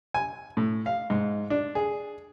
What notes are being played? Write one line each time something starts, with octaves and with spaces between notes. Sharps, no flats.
G#5
A2
F5
G#2
D4
G#4